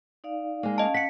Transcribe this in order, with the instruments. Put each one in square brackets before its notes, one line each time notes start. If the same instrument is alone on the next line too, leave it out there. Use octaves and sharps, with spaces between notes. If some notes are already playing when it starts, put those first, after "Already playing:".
[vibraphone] D#4 D5 F5
[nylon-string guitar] G#3 A#3
[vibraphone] C#4 F5 [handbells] D#5 A5
[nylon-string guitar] F#5 [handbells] B6 C#7